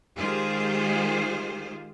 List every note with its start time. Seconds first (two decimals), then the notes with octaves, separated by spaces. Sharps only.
0.17 D#3 G#3 F4 G4 G#4 C5